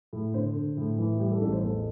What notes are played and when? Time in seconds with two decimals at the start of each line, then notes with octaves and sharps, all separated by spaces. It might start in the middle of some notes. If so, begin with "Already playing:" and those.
0.13 A2
0.34 D3 C5
0.55 D3
0.77 A2
0.98 E3
1.13 E4
1.20 G3 G4
1.31 A4
1.41 A1 A4
1.52 C5
1.63 E2 A4